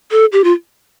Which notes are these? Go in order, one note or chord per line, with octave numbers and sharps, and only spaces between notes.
A4
G4
F4